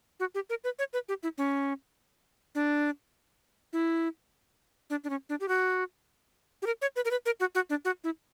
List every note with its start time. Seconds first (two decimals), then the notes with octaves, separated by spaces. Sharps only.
0.20 F#4
0.35 G4
0.50 A#4
0.64 B4
0.79 C#5
0.93 B4
1.09 G4
1.23 E4
1.38 C#4
2.55 D4
3.73 E4
4.90 D4
5.04 D4
5.10 C#4
5.29 D4
5.40 G4
5.48 F#4
6.62 G4
6.66 A#4
6.82 C#5
6.96 B4
7.05 A#4
7.11 B4
7.26 A#4
7.40 F#4
7.55 F#4
7.70 D4
7.85 F#4
8.04 E4